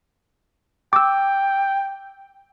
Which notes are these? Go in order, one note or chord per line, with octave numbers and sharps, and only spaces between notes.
G5 D6 E6